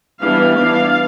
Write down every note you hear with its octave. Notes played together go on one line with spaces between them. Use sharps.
E3 G3 B3 D4 F5
E3 B3 D4